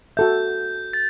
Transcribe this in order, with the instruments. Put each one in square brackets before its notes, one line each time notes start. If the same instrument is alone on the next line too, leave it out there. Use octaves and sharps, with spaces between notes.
[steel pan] F#4 A4 E5 [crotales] G6
[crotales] A6